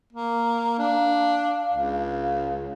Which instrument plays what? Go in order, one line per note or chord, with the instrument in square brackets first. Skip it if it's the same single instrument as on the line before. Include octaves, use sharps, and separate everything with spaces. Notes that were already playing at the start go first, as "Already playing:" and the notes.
[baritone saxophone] A#3
[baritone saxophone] D4 [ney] F5
[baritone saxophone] C#2